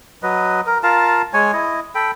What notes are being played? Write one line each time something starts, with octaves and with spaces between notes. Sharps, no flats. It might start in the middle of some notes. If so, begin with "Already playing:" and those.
F#3 B4 D#5
A#4
F4 A#4 F5 A5
G#3 C#5 G#5
E4 D#5
A4 G5 B5